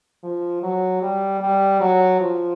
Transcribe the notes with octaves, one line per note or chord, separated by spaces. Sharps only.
F3
F#3
G3
G3
F#3
F3